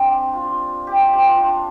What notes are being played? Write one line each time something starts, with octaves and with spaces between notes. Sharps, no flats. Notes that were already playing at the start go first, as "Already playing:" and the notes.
Already playing: C4 D4 G4
F4
G4
F4
G4
F4
D4